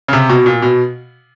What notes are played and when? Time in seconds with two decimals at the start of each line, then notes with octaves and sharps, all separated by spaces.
0.08 C#3
0.13 C3
0.29 B2
0.46 A#2
0.62 B2